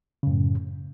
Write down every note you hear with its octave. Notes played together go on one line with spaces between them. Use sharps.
F#2 A2 C#3